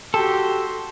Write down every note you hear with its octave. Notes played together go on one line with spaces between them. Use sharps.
F#4 G4 A4 C6